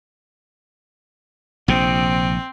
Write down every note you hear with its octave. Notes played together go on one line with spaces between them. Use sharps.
A#1 C3 C4